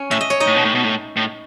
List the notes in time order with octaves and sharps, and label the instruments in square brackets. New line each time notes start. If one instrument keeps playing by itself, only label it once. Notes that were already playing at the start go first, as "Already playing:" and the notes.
Already playing: [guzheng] C#4 C#5
[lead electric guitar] A2 [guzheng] E5
[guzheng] D#5
C#5
D#4 D#5
[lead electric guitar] A2
B2
A2
B2
A2
A2